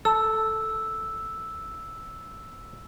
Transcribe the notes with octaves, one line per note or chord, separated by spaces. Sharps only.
A4 E6